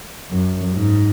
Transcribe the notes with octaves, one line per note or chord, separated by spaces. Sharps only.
F#2
G#2